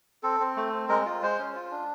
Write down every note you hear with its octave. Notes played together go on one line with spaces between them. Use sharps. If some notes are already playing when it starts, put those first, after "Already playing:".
C4 A4
C4
A3
C4
G#3 A#4
F4
G#3 C5
C#4
F4
D4